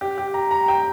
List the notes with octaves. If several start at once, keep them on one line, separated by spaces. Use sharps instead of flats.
G4
G4
A#5
A#5
G5